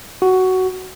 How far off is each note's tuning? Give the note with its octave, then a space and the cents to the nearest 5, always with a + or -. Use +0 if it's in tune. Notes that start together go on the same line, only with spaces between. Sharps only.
F#4 +10